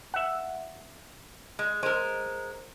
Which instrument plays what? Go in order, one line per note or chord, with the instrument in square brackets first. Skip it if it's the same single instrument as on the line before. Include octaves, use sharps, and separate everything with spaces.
[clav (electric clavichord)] E5 F#5
[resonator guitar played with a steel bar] G#3
[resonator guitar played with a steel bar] G#3 A#4 [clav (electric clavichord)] C5